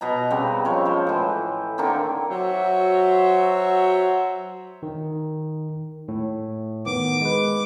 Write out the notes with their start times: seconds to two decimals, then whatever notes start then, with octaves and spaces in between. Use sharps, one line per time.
0.01 B2 D#5 A#5
0.30 C#3 G3 B3 C4
0.65 F3 C#5
0.85 G#3 C5
1.07 A2 E3
1.78 D3 D#3 A#3 C4
2.29 F#3 F#4 C5 C#5 E5
4.83 D#3
6.08 A2
6.86 D#3 B3 D6
7.21 G#3 B4